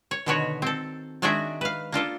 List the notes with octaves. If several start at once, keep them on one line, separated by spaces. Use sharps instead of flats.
C#5
B2 D3 D#3 B3 F#4 C#5
C4 A4
D#3 G#3 D4 F#4 G#4 E5
B4 F5
A#3 D4 F4 A4